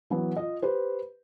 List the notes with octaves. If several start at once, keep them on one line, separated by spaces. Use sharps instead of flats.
E3 F#3 B3
F4 D#5
G4 B4 C5